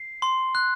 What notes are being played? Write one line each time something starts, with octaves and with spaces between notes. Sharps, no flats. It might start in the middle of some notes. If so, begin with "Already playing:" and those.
Already playing: C7
C6
F#6